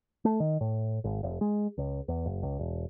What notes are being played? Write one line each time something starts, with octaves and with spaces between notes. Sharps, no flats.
A3
D#3
A2
G#1
F1
G#3
C#2
E2
F#1
C#2
E1